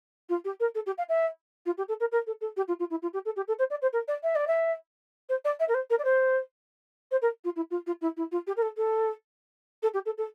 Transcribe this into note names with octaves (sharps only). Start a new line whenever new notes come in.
F4
G4
A#4
A4
G4
F5
E5
F4
G4
A4
A#4
A#4
A4
A4
G4
F4
F4
E4
F4
G4
A4
G4
A4
C5
D5
C5
A#4
D5
E5
D5
E5
C5
D5
E5
A#4
C5
A#4
D5
C5
C5
A#4
F4
E4
F4
F4
E4
E4
F4
G4
A#4
A4
A4
A4
G4
A4
A4